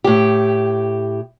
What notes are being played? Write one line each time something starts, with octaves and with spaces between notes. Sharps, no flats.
A2 G4